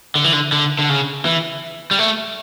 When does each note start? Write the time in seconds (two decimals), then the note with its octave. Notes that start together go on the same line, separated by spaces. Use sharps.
0.15 D3
0.24 E3
0.33 D3
0.52 D3
0.79 D3
0.89 C#3
1.25 E3
1.91 G3
1.99 A3